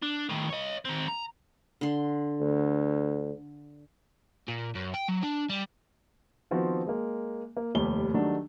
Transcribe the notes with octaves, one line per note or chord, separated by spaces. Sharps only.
D4
A2 D#3
C#5 D#5
D#3 C4
A#5
D3 C6
D2
A#2
F#2
G5
F#3
D4
G3
D#3 F3 B3 C4 F#4
G#3 A#3
A#3
F1 D#2 G3 G7
D#3 F#3 G3 A3 D4 D#4